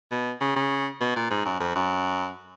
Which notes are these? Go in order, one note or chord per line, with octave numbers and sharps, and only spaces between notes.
B2
C#3
C#3
B2
A#2
G#2
F#2
F2
F#2